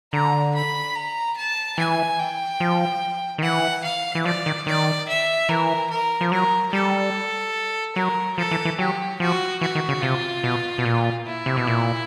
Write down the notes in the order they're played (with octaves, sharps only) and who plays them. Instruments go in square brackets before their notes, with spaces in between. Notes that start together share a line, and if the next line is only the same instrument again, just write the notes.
[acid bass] D3 [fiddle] A#5
[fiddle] B5
A#5
A5
[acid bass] E3 [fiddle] G#5
[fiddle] G5
[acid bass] F3
D#3
[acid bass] E3 [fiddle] F#5
[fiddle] F5
[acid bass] E3
[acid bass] F3 [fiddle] D5
[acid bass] D#3
[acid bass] D#3 [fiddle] D5
[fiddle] E5
[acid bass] E3 [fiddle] A#4
[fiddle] A#4
[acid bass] F3
[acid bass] F#3 [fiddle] A#4
[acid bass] G3 [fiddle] A4
[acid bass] F#3 [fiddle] A#4
[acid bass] F3 [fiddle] A4
[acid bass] E3
E3
[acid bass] F#3 [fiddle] G4
[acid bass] F3 [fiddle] F#4
[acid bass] E3 [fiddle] F#4
[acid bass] D#3
C#3
[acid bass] C3 [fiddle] F4
[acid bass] B2
B2
A#2
[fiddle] E4
[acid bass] C3
B2
A#2